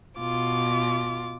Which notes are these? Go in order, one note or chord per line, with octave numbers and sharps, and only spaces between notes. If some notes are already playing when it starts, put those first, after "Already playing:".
B2 F4 D6